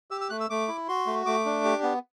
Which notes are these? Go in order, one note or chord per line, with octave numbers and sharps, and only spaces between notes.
G4 E6
E6
A3 F#6
E6
A3 D6
E4
F#4 C6
A3
A3 D6
D4
G4
B3